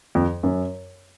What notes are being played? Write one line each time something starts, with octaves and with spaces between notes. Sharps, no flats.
F2
F#2